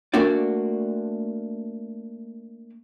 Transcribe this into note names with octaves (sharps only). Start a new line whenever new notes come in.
A3 A#3 D4 F#4 D5